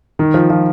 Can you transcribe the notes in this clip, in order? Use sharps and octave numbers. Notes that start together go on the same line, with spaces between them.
D#3
F3
F3